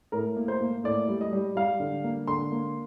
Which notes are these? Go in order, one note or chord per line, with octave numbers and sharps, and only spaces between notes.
A2 A#4
A#3
C5
A#3
A2 D5
G3
D#5
G3
G3 F5
D3
A#3
D3 C6
A#3